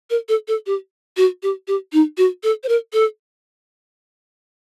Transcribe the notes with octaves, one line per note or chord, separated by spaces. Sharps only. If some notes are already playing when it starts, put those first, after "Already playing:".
A#4
A4
A4
G4
F#4
G4
G4
D#4
F#4
A4
C5
A#4
A4